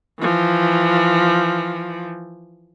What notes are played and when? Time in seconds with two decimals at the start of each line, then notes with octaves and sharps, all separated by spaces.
0.20 E3 F3